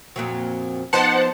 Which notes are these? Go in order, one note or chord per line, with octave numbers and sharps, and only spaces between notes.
F2 A#2 F#3
F3 B3 D#4 C5 F#5 A5